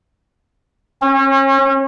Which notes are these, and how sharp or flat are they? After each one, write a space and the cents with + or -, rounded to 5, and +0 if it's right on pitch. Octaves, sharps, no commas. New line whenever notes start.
C#4 -35